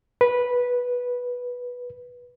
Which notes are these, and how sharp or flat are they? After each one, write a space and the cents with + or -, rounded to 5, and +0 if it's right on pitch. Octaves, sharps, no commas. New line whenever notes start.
B4 -10